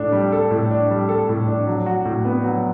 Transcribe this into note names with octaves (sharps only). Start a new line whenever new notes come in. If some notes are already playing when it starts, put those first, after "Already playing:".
Already playing: A2 D4 A4
G3
A4
A2
D4
G3
A4
A2
D4
F#3
F#4
A2
B3
F#3